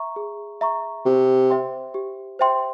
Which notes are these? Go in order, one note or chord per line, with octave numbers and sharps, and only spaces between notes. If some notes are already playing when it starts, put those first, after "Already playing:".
Already playing: E5 A#5 C#6
G#4
E5 A#5 C#6
C3 G4
C5 E5 G5 C6
G4
C5 E5 G5 C6